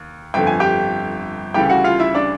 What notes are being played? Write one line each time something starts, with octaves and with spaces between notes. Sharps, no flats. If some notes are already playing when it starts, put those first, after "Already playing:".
Already playing: D#2
G1 F2 D3 G5
G#5
G4 G5
D2 C#3 E3 G3 G4 G5
F#4 F#5
F4 F5
E4 E5
D4 D5